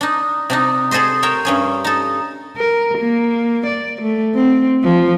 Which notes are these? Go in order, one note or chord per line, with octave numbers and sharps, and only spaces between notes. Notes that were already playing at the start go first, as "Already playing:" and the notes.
D4 D#4
C3 D4 D#4
G#4 A4 C5 D#5 C6
A#4 C#5 G5 A5 A#5
G2 C#4 G#4
D#4 A4
A#4
A#3
D5
A3
C4
F3